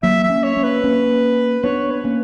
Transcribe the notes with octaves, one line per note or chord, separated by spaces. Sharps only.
F#3 A#3 E5
E5
A#3 C#4
C#5
A#3 C#4
B4
A#3 C#4
B3 D4 C#5
B4
A#3 C#4